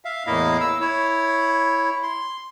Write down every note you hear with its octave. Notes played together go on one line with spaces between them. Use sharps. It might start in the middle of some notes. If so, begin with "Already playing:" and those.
E5 F5
E2 A2 A#3 E4 D#5 F5
E6
E4 C#5
C6